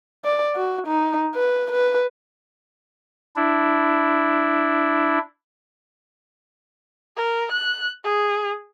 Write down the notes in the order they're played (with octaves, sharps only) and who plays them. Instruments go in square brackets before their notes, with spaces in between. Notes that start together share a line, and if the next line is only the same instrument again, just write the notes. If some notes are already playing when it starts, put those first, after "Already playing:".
[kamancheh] D5
F#4
D#4
B4
B4
[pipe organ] D4 E4
[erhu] A#4
F#6
G#4